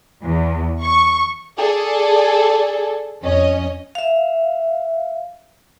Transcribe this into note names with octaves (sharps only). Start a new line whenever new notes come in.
E2
C#6
G#4 A4 D5
F2 C#4 D#5
E5 F5